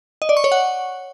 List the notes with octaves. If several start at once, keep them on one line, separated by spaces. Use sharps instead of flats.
D#5
D5
C#6
C#5
F#5